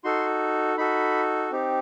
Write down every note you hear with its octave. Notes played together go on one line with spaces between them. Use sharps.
D#4 F#4 A4 C6
D#4 F#4 A4 B5
C4 D#4 G4